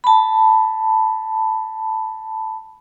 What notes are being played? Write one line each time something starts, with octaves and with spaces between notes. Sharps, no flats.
A5 B5